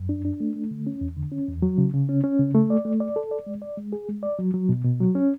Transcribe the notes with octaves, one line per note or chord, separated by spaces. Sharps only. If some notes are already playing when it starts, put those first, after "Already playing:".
Already playing: F#2
D4
D4
A3
A3
D3
C#4
E2
D3
C#4
E2
F#3
C#3
C#3
C#4
C#4
C#3
A3
D5
A3
D5
A4
D5
G#3
D5
G#3
G#4
G#3
D5
F#3
F#3
B2
B2
F#3
C#4